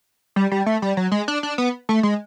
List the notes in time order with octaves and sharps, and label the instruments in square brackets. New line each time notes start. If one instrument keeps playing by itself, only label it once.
[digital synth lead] G3
G3
A3
G3
F#3
G#3
D4
D4
B3
A3
G#3